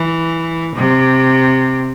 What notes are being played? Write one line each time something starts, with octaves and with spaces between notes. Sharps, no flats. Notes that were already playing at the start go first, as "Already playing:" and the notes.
Already playing: E3
C3